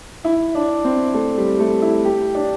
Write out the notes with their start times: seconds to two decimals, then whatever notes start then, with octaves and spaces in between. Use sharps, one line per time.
0.24 E4
0.55 D4
0.84 C4
1.14 A3
1.38 G3
1.59 A3
1.82 E4
2.05 G4
2.35 D4